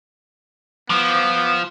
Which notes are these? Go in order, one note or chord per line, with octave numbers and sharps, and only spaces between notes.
F3 B3 D6